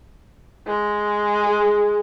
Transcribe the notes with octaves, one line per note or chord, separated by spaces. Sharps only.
G#3
G#4